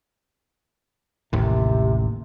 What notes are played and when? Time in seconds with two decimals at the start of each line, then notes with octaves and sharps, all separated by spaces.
1.33 A1 D#2 C3